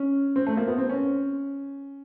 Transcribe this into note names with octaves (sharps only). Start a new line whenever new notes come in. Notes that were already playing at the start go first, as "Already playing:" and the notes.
Already playing: C#4
C4
A3
A#3
B3
C4
C#4